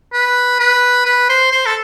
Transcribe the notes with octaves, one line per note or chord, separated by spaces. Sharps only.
B4
B4
B4
C5
C5
A4